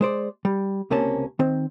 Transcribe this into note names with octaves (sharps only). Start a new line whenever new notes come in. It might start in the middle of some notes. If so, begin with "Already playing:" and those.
G#3 C5 D5
G3
C#2 C3 A#3 C#4 A5
D#3 C4